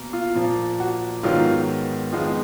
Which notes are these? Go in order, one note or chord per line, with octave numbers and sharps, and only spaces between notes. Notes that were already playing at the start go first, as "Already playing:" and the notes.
Already playing: B2 A#3
F4
A#2 F3 A#3
F#4
G#2 D#3 F#3 B3 F4
F2 D#3 G#3 B3 F4